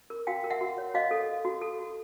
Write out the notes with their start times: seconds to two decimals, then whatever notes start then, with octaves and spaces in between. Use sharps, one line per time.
0.10 A#4
0.27 F#4 F5 G5
0.44 A#4
0.50 E5 F#5
0.61 F#4
0.78 C#5
0.94 F#4 D#5 F5
1.11 A4
1.28 A4
1.45 F#4
1.62 A4
1.78 F#4